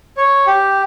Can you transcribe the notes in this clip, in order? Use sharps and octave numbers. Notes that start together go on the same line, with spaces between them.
C#5
G4